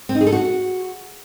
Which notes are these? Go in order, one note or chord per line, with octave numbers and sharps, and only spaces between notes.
C4
D#4
G#4
A4
F#4